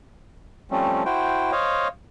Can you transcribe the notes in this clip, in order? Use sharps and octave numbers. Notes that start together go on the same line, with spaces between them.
F3 G3 A3 C4 C#4
E4 F#4 C5 G5
C5 C#5 D#5 F5